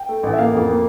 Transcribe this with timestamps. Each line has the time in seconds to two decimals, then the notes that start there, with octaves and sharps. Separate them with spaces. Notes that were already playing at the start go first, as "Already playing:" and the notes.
Already playing: G5
0.09 A3
0.23 A1
0.33 E5
0.38 A#3 F5
0.53 F2
0.68 A#3